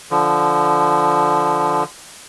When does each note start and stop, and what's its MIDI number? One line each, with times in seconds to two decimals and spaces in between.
0.11 1.84 50
0.11 1.84 53